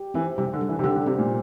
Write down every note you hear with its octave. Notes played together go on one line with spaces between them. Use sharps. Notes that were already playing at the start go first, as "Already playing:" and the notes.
Already playing: G4
E3 C4
C3 G3
D3
G3
E3
C3
D3 G4
D3
C3 C4
A#2